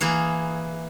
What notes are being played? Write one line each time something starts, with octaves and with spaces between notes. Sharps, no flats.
E3 A#3 G#4